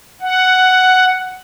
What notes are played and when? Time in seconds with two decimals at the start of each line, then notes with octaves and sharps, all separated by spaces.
0.21 F#5